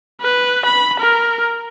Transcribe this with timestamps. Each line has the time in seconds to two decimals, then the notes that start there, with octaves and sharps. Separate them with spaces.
0.22 B4
0.66 B5
1.01 A#4